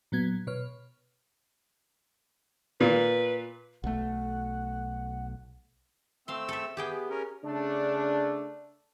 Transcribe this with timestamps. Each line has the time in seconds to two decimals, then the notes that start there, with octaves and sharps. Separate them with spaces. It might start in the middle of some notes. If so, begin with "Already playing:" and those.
0.12 A#2 F#3 B3 G#6
0.47 B2 B4 C#5 F6
2.80 A#2 B4
3.84 B1 A3 F#5
6.28 A3 C4 F5 C6 E6
6.48 A4 E5
6.77 B3 G4 G#4 G5
7.10 C#4 A#4
7.44 C#3 A3 D4